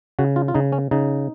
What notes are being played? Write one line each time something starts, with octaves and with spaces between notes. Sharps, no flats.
C#3 F#4
F4
F4
C#3 D#4
C#4
C#3 D#4